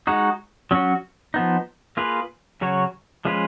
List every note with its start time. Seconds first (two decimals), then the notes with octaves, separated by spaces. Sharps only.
0.07 G#3 D#4 F#4
0.71 F#3 C#4 F#4
1.34 F3 B3 D#4
1.97 A#3 F4 G#4 B4
2.61 C#3 F#3 C#4 F#4 C#5
3.25 F3 G#3 C#4 F4 B4